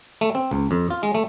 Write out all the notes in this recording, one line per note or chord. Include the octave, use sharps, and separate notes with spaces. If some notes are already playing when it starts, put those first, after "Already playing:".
A3
C4
C#2
F2
F4
G#3
A3